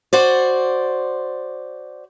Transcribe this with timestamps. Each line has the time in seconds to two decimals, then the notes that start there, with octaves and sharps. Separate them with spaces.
0.13 F#4 C5 D5